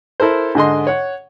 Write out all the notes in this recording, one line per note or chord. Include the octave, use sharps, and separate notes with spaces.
E4 A4 A#4 C5
G#2 D3 D#5 C6
C#5 F#5